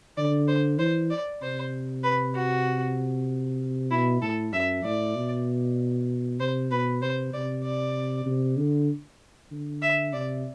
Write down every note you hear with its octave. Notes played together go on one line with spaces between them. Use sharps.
D3 D5
C5
E3 C5
D5
C3 C5
B4
F#4
B2 E4
A2 A4
F#2 E5
A2 D5
B2
C3 C5
B2 B4
C3 C5
C3 D5
D5
C3
D3
D3
E5
C3 D5